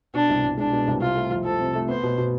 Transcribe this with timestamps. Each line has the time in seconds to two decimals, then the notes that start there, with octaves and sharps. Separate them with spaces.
0.14 B2 D4
0.29 C2
0.43 C2
0.57 G#3 D4
0.72 B2
0.88 C2
1.01 C3 F4
1.16 A3
1.31 F2
1.45 F3 A4
1.60 C3
1.75 A3
1.88 B3 C5
2.03 B2
2.18 B2